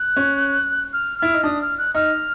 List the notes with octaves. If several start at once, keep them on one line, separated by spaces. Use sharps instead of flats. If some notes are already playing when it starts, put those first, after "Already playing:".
Already playing: F#6
C#4
F6
E4 F6
D#4
D4 D#6
F6
F#6
D#4 F6